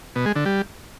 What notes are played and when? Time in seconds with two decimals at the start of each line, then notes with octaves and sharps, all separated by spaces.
0.16 B2
0.26 G#3
0.36 D3
0.45 G3